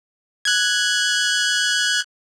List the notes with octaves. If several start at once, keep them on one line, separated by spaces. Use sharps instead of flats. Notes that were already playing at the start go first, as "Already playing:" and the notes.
F#6 G#6